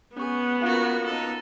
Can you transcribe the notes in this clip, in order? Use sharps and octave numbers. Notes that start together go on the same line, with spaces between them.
B3 C#4 G#4 C#6
A#3 C#4 F4 F#4 F5
D#4 A4